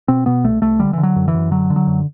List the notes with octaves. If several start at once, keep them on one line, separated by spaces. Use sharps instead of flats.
B2 C4
B2 B3
C2 A3
C2 A3
D3 G3
D3 E3
F#3
F#2
E3
F#2
D3 F#3
D3
F#3
F#2